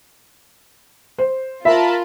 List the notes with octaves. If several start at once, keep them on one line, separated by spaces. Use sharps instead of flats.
C5
F4 A#4 E5 A5 B5